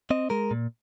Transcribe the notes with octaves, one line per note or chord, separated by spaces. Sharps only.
C4 D#5
G#3 A#4
A#2